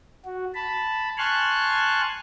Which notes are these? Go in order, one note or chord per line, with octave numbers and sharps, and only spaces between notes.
F#4
A5 B5
G#5 A5 C6 C#6 F6 F#6